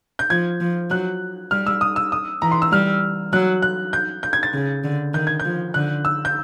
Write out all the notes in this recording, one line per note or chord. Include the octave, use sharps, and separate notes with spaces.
G6
F3 G#6
F3
F#3 F#6
G3 F6
E6
D#6
E6
D#6
E3 A#5
C6
E6
G3 F6
F#3 F#6
F#6
G6
G6
G#6
A6
C#3
D3
D#3 G6
G#6
G6
F3
D3 F#6
E6
G6